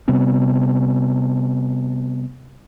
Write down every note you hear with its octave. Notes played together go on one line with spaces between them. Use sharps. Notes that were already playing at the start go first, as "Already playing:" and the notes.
C3 G3 B3 C4